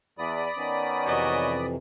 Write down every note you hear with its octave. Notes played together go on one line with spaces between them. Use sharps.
E2 D5 B5 D#6
D#3 B3 C#4
F2 C3 E3 F#4 C#5 D#5